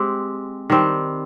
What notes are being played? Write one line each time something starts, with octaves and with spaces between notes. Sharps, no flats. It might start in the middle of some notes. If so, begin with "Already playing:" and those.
Already playing: G#3 C4 G4
D#3 G3 C4